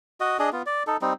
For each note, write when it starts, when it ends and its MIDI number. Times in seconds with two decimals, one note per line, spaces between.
0.20 0.37 66
0.20 0.37 75
0.39 0.50 62
0.39 0.50 68
0.39 0.50 75
0.53 0.62 59
0.53 0.62 65
0.66 0.83 74
0.87 0.97 63
0.87 0.97 69
1.02 1.13 55
1.02 1.13 60
1.02 1.13 63